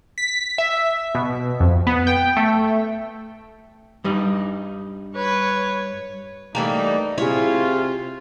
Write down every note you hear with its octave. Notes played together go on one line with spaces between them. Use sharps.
B6
E5
B2
F2
B3
G5
A3
G2 G3 D#4
B4 C#5
E3 G3 A3 A#3 D#4
C3 E4 F4 G#4 C#5